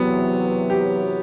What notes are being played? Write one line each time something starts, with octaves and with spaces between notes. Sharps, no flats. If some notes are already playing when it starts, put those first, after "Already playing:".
Already playing: E2 C3 F#3 B3
G4